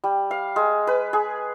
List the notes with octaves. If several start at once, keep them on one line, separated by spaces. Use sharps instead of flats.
G3
F5
G#3
B4
G#4